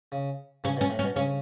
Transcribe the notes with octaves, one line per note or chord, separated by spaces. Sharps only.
C#3
C#3 C#4
B2
C#4
A2
C#4
B2
C#3 C#4